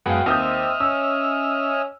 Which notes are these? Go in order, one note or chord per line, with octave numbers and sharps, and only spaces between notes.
F#2 G#3 B3 F#4 F5 G5
D#2 C4 D#5 E5 D#6 F6 G6
C#4 E6